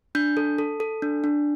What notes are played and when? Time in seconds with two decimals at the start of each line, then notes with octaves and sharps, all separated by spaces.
0.15 D4 G6
0.37 A4
0.58 A4
0.80 A4
1.02 D4
1.24 D4